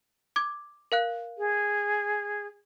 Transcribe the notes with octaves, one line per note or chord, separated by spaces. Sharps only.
D6 G#6
A#4 F5 F#6
G#4